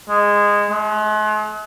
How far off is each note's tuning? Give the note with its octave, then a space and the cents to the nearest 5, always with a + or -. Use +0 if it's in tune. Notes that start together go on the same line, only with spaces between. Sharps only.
G#3 -15
G#3 +45